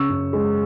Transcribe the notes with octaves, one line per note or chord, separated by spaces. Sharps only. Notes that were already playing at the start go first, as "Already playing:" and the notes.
Already playing: C#3 C#6 E6
F#2
G#3